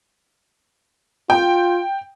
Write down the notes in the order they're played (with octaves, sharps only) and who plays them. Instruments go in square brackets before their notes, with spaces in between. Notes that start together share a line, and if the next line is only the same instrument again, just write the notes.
[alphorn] F4 [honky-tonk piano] G5